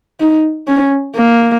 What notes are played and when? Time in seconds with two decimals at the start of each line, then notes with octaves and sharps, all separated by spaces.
0.20 D#4
0.68 C#4
1.16 A#3